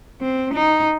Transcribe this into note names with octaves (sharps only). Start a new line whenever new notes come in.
C4
D#4